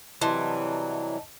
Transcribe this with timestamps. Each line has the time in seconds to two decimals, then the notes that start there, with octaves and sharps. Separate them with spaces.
0.21 C3 E3 F#3 G3 E4 D#5 A5 C6